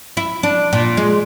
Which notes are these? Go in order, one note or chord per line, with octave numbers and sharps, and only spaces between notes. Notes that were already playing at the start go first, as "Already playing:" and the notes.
E4
D4
A#2
G#3